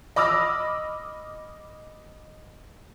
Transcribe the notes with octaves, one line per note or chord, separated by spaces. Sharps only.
D#5 B5 D6 E6 F6 A#6